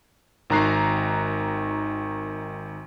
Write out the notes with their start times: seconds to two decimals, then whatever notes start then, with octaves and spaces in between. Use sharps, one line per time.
0.50 G#1 D#3 A#5 F#6 C7